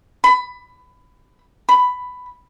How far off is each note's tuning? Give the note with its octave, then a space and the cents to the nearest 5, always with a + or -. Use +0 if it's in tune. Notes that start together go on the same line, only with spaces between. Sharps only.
B5 +20
B5 +10